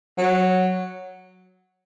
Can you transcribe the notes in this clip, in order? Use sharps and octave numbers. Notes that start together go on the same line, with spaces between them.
F#3